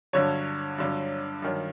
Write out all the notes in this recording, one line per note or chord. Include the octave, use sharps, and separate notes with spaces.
G2 D3 F#3 C#5
G2 D3 F#3
G2 D#3 F#3